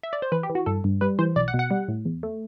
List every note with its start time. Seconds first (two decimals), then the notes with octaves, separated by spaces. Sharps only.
0.03 E5
0.13 D5
0.22 C5
0.32 E3 B4
0.43 G4
0.50 E3
0.55 F#4
0.66 G2 A4
0.84 G2
1.01 G3 B4
1.19 E3 C5
1.36 B1 D5
1.48 F#5
1.54 B2
1.59 F#5
1.71 G3
1.88 A2
2.05 E2
2.23 A3